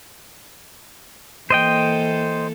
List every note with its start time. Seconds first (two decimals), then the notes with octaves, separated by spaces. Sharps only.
1.50 E3 A#3 A4 C5 D#5 G5